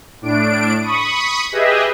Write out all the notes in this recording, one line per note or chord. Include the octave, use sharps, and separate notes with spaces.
A2 D4 D7
B5 C#6 D#6
G4 G#4 B4 D#5 E5